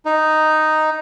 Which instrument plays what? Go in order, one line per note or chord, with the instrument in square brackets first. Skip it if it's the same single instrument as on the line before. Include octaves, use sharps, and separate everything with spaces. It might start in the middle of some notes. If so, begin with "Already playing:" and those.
[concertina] D#4